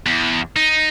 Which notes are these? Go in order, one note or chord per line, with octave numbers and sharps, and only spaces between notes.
E2
D#4